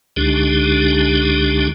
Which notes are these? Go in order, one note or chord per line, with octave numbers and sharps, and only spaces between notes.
C#2 D3 G#3 D4 D#4 G4